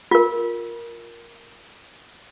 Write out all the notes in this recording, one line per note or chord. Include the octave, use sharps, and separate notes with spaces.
F4 A#4